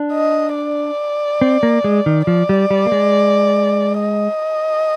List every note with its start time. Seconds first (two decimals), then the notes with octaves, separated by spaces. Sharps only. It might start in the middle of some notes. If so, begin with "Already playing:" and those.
Already playing: D4
0.13 D#5
0.55 D5
1.41 C4
1.63 A#3
1.84 G#3
2.06 D#3
2.27 F3 D5
2.49 G3
2.71 G3
2.86 A#3
2.92 G#3
4.00 D#5